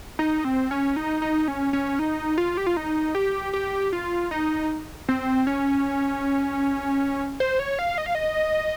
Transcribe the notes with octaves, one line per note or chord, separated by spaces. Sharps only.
D#4
C4
C#4
D#4
D#4
C#4
C#4
D#4
F4
G4
F4
D#4
G4
G4
F4
D#4
C4
C#4
C5
C#5
F5
D#5
F5
D#5